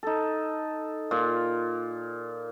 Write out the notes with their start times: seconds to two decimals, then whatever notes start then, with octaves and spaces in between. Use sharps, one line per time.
0.03 D#4 A4
1.11 A#2 F4